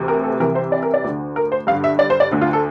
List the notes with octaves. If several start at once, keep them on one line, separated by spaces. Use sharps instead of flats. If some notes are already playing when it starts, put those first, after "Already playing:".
Already playing: D2 C3 E3
A#4
A4
C2 C3 E3 A#4
C5
D5
A#4
D5
D2 D3
A#4
C5
G2 D3 F5
E5
D5
C5
D5
D2 D3
F4
A4